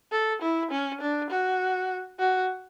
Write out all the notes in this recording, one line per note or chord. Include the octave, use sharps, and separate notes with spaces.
A4
E4
C#4
D4
F#4
F#4